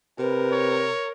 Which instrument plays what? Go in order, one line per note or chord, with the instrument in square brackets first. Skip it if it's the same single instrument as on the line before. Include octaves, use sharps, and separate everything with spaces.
[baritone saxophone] C3 [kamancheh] A#4 [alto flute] B4
[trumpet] C#5